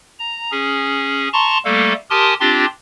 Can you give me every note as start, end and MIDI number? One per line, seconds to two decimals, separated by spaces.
0.19 0.51 82
0.51 1.28 61
0.51 1.28 68
1.33 1.58 81
1.33 1.58 82
1.33 1.58 84
1.33 1.58 85
1.65 1.93 55
1.65 1.93 57
1.65 1.93 58
1.65 1.93 69
2.10 2.34 67
2.10 2.34 70
2.10 2.34 80
2.10 2.34 81
2.10 2.34 84
2.10 2.34 87
2.40 2.65 60
2.40 2.65 62
2.40 2.65 65
2.40 2.65 67
2.40 2.65 84